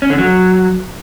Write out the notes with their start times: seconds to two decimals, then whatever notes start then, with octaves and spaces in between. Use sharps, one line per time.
0.02 C#4
0.10 D3
0.18 F#3